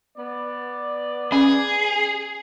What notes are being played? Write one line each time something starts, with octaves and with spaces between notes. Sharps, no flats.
B3 D5
C#4 G#4